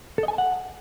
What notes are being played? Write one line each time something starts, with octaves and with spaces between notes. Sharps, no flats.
A4
D#5
G#5
A5
F#5